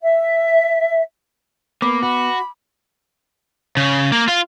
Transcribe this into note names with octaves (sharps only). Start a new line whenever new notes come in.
E5
A#3 B3 B5 D6
F#4 B5
C#3
A#3
F4 F5